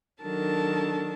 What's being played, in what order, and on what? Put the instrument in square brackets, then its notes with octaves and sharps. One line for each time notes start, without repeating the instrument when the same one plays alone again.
[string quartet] D#3 F#3 D4 A4 A#4 A5